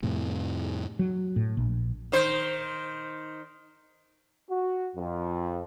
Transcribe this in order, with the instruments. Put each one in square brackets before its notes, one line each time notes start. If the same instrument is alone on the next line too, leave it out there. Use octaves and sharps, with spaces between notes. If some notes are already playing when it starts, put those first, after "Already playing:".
[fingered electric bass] F2 A2 C3
[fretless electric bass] F#3
A2
A#1
[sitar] D#3 C5
[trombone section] F#4
F2